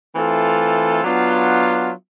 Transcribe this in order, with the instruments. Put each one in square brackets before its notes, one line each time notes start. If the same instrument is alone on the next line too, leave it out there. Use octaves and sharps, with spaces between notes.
[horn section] E3 A3 C4 F4 A4
F#3 B3 D4 F4